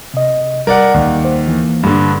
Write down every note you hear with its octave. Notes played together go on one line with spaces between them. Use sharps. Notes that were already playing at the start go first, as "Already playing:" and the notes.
C3 D#5
G3 A#4 D5 F#5
D#2
C5
E3 A#3
G2 D3